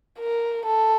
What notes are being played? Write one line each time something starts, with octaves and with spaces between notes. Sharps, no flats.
A#4
A4